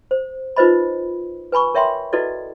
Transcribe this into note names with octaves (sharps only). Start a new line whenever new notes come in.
C5
D#4 F4 B4 C5 D#5 B5
B4 G#5 B5 C#6
A#4 C#5 E5 G5 B5 C6
E4 F#4 A4 B4 D5 D#5